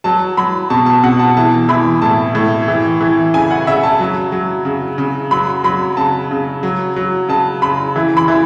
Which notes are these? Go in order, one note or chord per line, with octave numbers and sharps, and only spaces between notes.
F#3 A5
F#3 B5
B2 A5
A5
B2 F#5
A5
E3 A5
E3 B5
A2 A5
A2
E3
E3
C#3 G#5
F#5
C#3 E5
A5
F#3
F#3
C#3
C#3
F#3 B5
F#3 B5
C#3 A5
C#3
F#3
F#3
C#3 A5
C#3 B5
E3
B5
E3